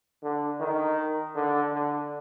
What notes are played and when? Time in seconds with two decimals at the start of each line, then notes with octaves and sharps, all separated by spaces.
0.23 D3
0.60 D#3
1.35 D3
1.73 D3